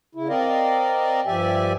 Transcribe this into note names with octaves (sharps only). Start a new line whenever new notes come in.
C#3 E4
C4 A#4 D5 D#5 F5
G2 F3 G4 D5 E5 G#5